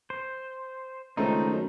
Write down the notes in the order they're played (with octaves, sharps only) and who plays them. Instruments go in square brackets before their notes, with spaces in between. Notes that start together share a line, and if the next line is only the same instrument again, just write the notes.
[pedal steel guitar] C5
[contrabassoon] C#2 [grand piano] D#3 A3 C4 [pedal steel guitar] D#4
[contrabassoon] F#2